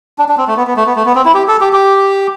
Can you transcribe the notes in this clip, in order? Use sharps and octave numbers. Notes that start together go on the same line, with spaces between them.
D4
D4
C4
A3
B3
B3
A3
B3
A3
B3
C4
E4
G4
A4
G4
G4